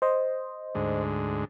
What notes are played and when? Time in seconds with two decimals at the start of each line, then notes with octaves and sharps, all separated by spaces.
0.02 C5 D#5
0.75 D2 G#2